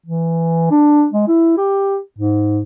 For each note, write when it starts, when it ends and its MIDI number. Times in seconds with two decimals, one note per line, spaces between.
0.06 0.69 52
0.71 1.06 62
1.12 1.27 56
1.28 1.54 64
1.58 1.98 67
2.19 2.61 44